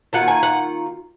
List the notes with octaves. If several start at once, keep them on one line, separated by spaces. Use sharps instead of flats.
D#3 A#3 F4 F#5
G#5
F#5